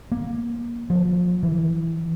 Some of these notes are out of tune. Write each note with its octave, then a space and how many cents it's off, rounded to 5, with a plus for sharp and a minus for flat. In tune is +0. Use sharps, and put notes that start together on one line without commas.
A#3 +20
F3 +30
E3 +0